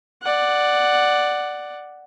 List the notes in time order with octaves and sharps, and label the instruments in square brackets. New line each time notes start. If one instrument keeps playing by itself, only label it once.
[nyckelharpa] D5 F#5